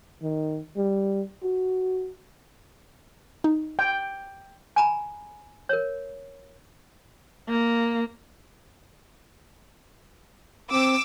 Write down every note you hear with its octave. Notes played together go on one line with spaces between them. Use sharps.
D#3
G3
F#4
D#4
G5
G#5 A#5 B5
A#4 C#5
A#3
C4 D6 E6